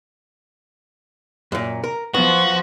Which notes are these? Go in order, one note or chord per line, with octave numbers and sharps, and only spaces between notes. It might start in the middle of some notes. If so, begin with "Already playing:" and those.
F#2 A#2
A#4
F3 B3 F#4